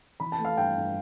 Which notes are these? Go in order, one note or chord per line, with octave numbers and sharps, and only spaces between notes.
E3 B5
A5
A3
F5
G2 G5
G2